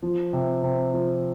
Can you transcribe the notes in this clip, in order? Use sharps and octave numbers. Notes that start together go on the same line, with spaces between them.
F3
C3
C3
F3